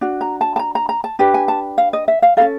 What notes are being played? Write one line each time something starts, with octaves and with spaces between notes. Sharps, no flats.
D4 F#4
A#5
A5
A5
A#5
A#5
A#5
A5
D4 G4 B4
G#5
A5
F5
D#5
E5
F5
C#4 F4 A4 F5